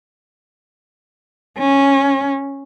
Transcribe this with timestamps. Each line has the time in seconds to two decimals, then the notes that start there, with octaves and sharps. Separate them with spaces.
1.59 C#4